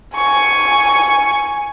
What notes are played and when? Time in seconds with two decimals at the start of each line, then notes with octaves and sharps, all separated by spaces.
0.16 G#5 C#6